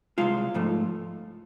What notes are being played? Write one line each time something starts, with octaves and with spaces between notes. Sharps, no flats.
C2 B2 G#3 F4 F5
G#2 F3 A3